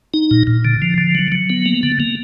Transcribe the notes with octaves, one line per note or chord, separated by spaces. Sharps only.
D#4
A#2
A#2
D3
F3
D3
F#3
F#3
B3
A#3
D3
A#3